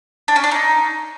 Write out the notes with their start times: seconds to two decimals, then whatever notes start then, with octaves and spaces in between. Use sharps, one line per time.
0.28 D4
0.36 C#4
0.44 D4
0.51 D#4